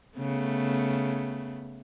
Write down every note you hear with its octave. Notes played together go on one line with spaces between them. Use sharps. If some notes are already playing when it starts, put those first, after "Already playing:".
C#3 A3 B3